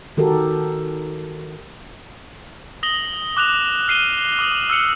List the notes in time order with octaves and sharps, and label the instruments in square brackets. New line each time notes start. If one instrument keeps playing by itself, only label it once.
[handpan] D#3 F#4 G4 A4 A#4
[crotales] D#6 A#6 F#7 G7
D6 F#6 E7 F7
F6 C7 D#7 G7
D6 D#6 F#7
E6 F6 C#7 G7